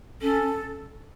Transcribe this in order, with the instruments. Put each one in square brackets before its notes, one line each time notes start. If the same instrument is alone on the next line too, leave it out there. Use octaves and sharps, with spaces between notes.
[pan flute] C#4 [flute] A4